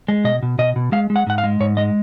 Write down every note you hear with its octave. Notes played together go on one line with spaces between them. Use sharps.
G#3
B2 D#5
B2
B2 D#5
B2
G#3 F5
G#3
F#5
G#2 F#5
F5
G#3
G#2 C#5
G#3 D#5